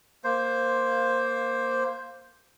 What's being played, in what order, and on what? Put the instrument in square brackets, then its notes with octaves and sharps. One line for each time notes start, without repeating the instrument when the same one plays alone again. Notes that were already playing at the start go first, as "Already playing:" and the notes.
[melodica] A#3 C5